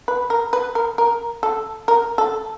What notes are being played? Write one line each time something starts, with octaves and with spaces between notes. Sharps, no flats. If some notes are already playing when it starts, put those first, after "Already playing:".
B4
A#4
B4
A#4
A#4
A4
A#4
A4